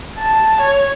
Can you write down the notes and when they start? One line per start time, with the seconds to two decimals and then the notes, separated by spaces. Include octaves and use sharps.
0.19 A5
0.61 C#5